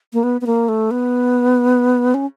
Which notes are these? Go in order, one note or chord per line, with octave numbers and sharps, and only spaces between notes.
A#3
B3
B3
A#3
A3
B3
C#4